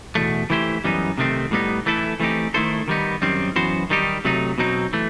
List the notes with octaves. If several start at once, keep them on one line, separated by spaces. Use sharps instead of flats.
E2 B2 A3
E3 A3 E4 G4 C5
F#2 E3 G3 B3 D#4
C3 D#3 A3 C4
A2 G3 B3 D#4
E3 A3 E4 A4
E3 A3 C4 D#4 G4
D#3 A3 E4 A4 C5
D#3 G3 B3 D#4
F#2 D#3 G3 C4
F#2 E3 B3 F#4 C5
D#3 G3 D#4 G4
C3 F#3 A3 D#4
B2 F#3 C4 D#4
E3 A3